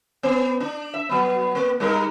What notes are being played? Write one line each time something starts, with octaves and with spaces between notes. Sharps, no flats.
B3
D4
E5
F#3 B3
A#3
G3 D#4 A#4